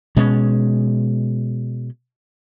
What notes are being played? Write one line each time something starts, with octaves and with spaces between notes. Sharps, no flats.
B2 G#3 C#4